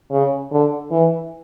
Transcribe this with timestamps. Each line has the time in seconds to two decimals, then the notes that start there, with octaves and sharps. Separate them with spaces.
0.11 C#3
0.52 D3
0.91 E3